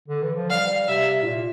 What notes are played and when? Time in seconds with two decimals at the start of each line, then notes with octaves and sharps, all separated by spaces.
0.08 D3
0.23 E3
0.36 F3
0.50 G3 F5
0.88 C3 E5
1.22 A2
1.26 A#2